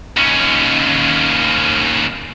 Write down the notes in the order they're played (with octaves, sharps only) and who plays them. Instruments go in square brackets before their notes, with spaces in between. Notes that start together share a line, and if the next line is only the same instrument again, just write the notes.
[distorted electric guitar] D#2 C#4